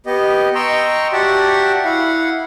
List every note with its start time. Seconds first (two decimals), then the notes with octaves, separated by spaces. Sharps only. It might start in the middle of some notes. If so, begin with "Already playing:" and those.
0.06 B3 G4 D#5
0.55 D#5 G5 A#5 C6 C#6 E6
1.13 F#4 G4 D5 E5 F#5 A5
1.85 E4 F5 F#5